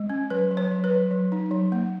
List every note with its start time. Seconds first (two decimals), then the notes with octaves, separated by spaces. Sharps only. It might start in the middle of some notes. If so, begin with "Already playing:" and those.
Already playing: G#3
0.10 C#4
0.30 F#3 B4
0.51 F#3
0.57 C#5
0.71 F#3
0.84 B4
0.91 F#3
1.11 F#3
1.32 D#4
1.51 F#3
1.72 A#3